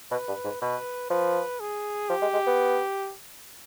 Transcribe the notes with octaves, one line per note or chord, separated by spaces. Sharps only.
B2 B4
G2
G#2
B2 B4
F3 B4
G#4
F3 G4
G#3
G#3
B3